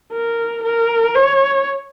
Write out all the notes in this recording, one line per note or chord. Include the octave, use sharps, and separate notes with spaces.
A#4
A#4
C#5